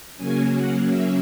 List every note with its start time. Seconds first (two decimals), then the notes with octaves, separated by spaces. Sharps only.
0.17 C#3 F#3 A#3 C#4 G#5
0.51 F#5
0.86 E5